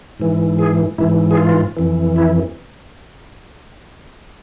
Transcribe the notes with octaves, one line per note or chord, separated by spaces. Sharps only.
G#2 E3
G#4
G#2 E3 E4
G#4
F4
F2 E3
E4